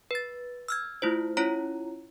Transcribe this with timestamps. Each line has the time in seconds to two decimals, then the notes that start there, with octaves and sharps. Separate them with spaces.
0.11 B4 A6
0.68 E6 F6 G#6
1.02 A3 E4 F4 C5
1.37 C#4 E4 F4 C#5 A#5